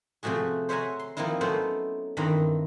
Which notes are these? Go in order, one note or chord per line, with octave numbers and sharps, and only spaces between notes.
C3 F3 A3 F#4 G#4
C5 C#5 E5 F#5 G#5 A#5
C6
F3 A#3 C4 D#4 E4
F#3 A3 B3 C#4 A4 C5
G2 D#3 E3 C4 B4 A#5